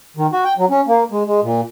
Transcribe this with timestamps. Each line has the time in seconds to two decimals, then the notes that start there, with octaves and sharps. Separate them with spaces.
0.17 D#3
0.32 F#4
0.44 G5
0.58 F#3
0.70 C#4
0.87 A#3
1.12 G#3
1.26 G#3
1.43 A#2